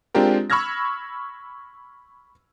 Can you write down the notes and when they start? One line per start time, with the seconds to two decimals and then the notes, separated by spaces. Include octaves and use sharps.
0.15 G#3 C4 D4 F4 G4 A#4
0.50 B5 C#6 E6 F6 G#6 A#6